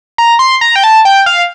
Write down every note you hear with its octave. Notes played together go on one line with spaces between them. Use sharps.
A#5
C6
A#5
G5
A5
G5
F5